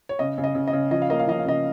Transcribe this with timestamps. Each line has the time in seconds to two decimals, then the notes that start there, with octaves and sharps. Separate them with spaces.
0.09 C#5
0.19 C#3 D#5
0.38 C#3
0.44 D#5
0.55 C#3
0.68 D#5
0.73 C#3
0.91 F3 D#5
1.02 F5
1.10 A#3 D#5
1.19 F5
1.27 F3 D#5
1.40 F5
1.45 C#3 D#5